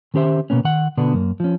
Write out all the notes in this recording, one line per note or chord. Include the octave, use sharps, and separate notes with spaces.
D#3 C#4 G4 C5 E5
B2 A#3 B3 C#4
D#3 F#5
B2 D3 B3 D4
F#2 A#3
F3 C#4